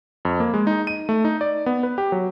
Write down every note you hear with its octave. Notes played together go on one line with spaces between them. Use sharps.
F2
A#3
G#3
D#4
D#7
A3
D#4
D5
B3
B4
G4
F#3